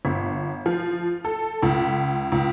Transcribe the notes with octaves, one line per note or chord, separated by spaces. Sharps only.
G1
F3
A4
C#2
C#2